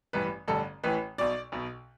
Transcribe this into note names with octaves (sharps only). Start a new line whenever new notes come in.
A1 G2 E3 B4
A1 G2 D3 A4
A1 A2 E3 B4
B1 B2 D5
B1 B2